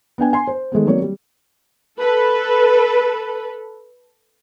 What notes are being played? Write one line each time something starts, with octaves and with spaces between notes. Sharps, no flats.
B3 D4 G5 G#5
G#5 C6
C5
D#3 G#3 A3 B3
F#3 A#3 C4 C#5 D5
G3
A4 B4